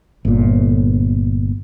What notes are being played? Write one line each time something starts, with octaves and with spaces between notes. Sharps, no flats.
G1 A#2